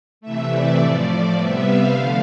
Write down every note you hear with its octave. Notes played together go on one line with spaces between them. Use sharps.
C3 E3 A3 E5
D5
A2 F3 A3
D5
C3 G3 B3 E5
F5
D3 F3 A3 F5